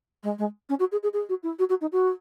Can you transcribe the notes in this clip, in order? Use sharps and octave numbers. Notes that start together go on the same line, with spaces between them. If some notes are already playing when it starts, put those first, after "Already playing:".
G#3
G#3
C#4
F#4
G#4
G#4
G#4
F#4
E4
F#4
F#4
D#4
F#4